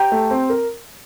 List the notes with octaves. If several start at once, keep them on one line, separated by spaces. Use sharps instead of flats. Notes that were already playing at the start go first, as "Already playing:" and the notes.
Already playing: G4 C5 G5 A#5
A3
C4
A#4